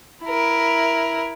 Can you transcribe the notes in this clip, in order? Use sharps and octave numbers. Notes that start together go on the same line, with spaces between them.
E4 A#4